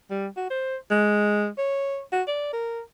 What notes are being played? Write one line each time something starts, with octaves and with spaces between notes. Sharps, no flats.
G3
F#4
C5
G#3
C#5
F#4
D5
A#4